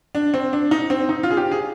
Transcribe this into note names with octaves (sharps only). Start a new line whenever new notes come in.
D4
C4
D4
D#4
C4
D#4
F4
G#4
G4
G#4